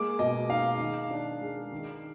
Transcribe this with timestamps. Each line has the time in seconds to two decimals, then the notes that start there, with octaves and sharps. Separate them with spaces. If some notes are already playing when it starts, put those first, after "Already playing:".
Already playing: G#3 A#3 D6
0.19 B2 D#5
0.49 D#4 F5
0.80 D#3
1.11 D4
1.41 G#3
1.71 D#3